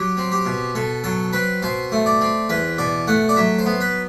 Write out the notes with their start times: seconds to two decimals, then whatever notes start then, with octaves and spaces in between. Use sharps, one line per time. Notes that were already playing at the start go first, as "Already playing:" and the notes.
Already playing: F#3 G4
0.17 C4
0.32 G4
0.46 B2
0.75 B2 A4
1.04 F#3 A4
1.33 C4 B4
1.63 B2 C5
1.92 A3
2.06 D5
2.21 C4
2.49 E2 B4
2.78 B2 D5
3.07 A3 F#5
3.29 D5
3.36 F#3 E5
3.59 C5
3.66 B3
3.81 B4